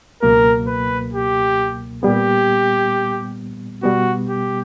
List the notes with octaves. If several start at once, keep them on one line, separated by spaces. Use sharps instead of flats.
C#2 B2 F#3 A#3 A#4
B4
G4
A#2 G3 B3 G4
B2 G3 B3 F#4
G4